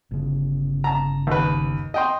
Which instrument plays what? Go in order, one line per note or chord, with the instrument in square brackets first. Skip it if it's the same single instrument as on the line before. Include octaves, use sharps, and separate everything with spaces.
[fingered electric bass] G1 C#3
[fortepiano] A5 A#5
D#2 B4
D#5 G5 C6